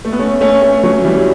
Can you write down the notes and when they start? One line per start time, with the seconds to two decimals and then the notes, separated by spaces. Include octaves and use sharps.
0.05 A3
0.13 B3
0.19 A3 C#4
0.41 A3 C#4
0.62 A3 C#4
0.83 F#3 A3
1.04 E3 G3
1.15 G3